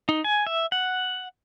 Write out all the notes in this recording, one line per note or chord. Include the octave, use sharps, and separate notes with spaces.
D#4
G#5
E5
F#5